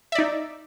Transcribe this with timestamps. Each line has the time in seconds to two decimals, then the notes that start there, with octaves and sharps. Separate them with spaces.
0.12 E5
0.15 D5
0.18 D#4